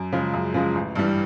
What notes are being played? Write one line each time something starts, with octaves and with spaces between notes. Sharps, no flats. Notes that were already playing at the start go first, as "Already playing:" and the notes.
Already playing: F#2
C#3 F3 G#3
F#2
C#3 F3 G#3
A1
G2 E3 G3